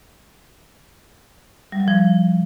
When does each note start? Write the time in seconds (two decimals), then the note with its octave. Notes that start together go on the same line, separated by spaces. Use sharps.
1.72 G3
1.80 F#3
1.88 F3